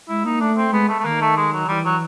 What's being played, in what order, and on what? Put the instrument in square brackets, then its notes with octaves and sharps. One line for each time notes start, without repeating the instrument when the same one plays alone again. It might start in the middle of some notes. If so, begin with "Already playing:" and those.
[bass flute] G#3 [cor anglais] E4
[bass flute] A#3 [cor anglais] D#4
[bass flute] A3 [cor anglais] D4
[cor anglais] C4
[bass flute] G#3 [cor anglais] B3
[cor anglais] A3
A3
[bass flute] D#3 [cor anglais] A#3
[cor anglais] A3
G#3
F#3
[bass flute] E3 [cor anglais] G3
[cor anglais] F#3